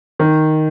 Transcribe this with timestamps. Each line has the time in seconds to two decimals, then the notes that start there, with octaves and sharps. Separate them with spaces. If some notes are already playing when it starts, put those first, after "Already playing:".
0.19 D#3